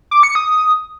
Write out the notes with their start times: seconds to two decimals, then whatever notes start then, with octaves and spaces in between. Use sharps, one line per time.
0.11 D6
0.23 C#7
0.35 D#6